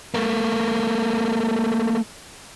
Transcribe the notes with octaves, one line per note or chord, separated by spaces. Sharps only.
A3 A#3